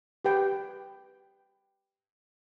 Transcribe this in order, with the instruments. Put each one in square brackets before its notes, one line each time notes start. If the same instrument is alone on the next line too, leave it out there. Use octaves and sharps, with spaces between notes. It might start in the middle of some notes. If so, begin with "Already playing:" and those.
[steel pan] G4 B4 G5